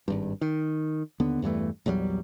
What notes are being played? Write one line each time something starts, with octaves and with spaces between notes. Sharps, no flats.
G#1 G2
D#3
D#2 D3 B3
E2 G2 E3 A3
A#1 E2 F#3 G3